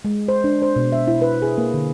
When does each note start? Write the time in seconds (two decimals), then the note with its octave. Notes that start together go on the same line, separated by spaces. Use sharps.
0.05 G#3
0.28 C5
0.44 D4
0.62 C5
0.76 B2
0.92 E5
1.08 E4
1.22 B4
1.42 G#4
1.58 A#3
1.74 D3